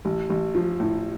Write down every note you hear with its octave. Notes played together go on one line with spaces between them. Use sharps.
A1
A1
F3
A2